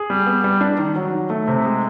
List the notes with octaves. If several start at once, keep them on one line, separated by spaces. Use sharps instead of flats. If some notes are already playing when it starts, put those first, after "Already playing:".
Already playing: G#4
G3
B3
G3
D4
D#3
F#3
D#3
A3
C3
G#3